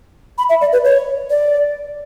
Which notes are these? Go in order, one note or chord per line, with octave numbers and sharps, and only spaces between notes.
B5
E5
D5
B4
C#5
D5